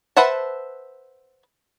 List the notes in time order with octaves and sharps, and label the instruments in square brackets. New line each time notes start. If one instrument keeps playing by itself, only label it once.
[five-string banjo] B4 C5 E5 F#5 A5